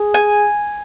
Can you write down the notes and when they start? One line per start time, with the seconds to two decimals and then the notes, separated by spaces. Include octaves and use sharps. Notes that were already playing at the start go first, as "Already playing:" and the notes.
Already playing: G#4
0.14 G#5